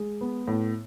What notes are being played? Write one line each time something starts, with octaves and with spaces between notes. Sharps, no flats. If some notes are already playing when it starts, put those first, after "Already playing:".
Already playing: G#3
B3
A2